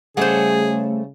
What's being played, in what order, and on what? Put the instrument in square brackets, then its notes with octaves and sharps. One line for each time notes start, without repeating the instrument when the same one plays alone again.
[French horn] C#3 [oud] G3 A3 [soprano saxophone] G#4 [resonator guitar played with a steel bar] C5 C#5 F#5